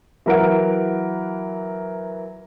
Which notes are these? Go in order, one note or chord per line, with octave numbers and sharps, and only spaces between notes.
E3 F#3 A#4 E5 F#5 D7